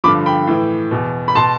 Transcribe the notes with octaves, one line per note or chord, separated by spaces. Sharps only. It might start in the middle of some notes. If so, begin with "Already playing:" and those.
G2 D3 F3 B5 D6
G5 B5
A2 E3
E2 B2
B5
B2 A5 C6